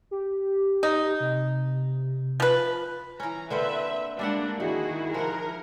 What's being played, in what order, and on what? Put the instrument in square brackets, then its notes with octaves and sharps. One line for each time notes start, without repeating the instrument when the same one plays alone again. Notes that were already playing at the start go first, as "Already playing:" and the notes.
[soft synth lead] G4
[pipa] D#4
[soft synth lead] C3
[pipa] F3 B4
[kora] E3 C#4 [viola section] A#5
[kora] D3 A#3 C4 [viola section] B4 E5
[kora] G3 E5 F#5 [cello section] G#3 A#3 [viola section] D4
[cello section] D#3 E4 G#4 [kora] D#4 [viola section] F#4
[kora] F3 F#5 [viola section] A#4